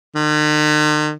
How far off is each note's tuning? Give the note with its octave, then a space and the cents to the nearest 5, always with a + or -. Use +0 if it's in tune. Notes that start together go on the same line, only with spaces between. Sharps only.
D#3 -45